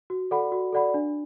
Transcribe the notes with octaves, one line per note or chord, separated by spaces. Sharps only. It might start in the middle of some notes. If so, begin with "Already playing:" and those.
F#4
A4 D5 F#5 B5
F#4
A4 D5 F#5 B5
D4